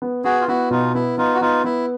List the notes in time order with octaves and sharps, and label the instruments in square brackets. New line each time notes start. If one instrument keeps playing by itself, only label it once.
[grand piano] B3
[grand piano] B3 [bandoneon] F#4 G#4
[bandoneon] F4
[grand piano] B3 [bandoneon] E4 F#4
[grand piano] B2 [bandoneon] D#4 F4
[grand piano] B3 [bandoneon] E4
[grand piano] B3 [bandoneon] D#4 F4
[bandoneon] F#4
[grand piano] B3 [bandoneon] D#4 F4
[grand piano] B3 [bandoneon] E4